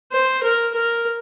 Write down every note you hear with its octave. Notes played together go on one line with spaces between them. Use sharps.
C5
A#4
A#4